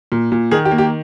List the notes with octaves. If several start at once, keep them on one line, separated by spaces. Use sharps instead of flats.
A#2
A#2
D#3 G#4
G4
A#3
G4